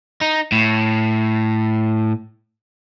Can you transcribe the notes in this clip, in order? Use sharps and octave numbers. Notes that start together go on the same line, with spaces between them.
D#4
A2